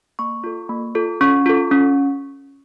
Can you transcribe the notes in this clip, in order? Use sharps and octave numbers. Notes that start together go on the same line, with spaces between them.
A#3 C#6
F4 A4
A#3
F4 A4
C#4 C#6
F4 A4
C#4